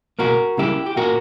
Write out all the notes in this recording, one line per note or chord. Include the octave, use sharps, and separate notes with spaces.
C#2 B2 A#3 F#4 A#4
C#2 C#3 G3 A#3 E4 G4
G4
A#2 A#3 F#4 A#4